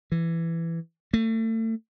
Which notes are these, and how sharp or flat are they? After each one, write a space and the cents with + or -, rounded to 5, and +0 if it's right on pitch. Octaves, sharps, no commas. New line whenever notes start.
E3 +15
A3 +35